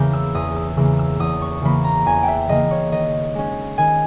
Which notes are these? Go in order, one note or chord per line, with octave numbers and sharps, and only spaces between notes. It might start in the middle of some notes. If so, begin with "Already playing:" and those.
Already playing: E2 C#3 E3 A#3 G6
E6
E2 D#6
E6
C#3 E3 A#3 E6
E6
E2 D#6
C#6
C#3 E3 A#3 B5
A#5
E2 G#5
E5 G5
C#3 E3 A#3 D#5
C#5
D#3 D#5
G#3 C#4
D#3 G#5